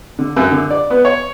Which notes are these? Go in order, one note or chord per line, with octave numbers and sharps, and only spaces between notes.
D3
F#2
D3
D5
B3
C#5